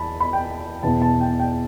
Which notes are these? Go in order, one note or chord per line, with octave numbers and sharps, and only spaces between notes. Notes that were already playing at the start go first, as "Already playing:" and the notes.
Already playing: E2 A5 B5
B5
G5
E2 B2 B3 E4 A5
A5
G5
G5